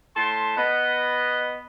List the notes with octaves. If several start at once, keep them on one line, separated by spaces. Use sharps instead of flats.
A2 A5 C6
B3 D#5